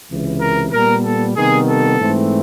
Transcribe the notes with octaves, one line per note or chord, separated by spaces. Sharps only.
C#2 C3 E3
A#4
A#2 G3 B3 A#4
A4
C3 D#3 G3 B3 G#4
A4
G#2 E3 A3 C4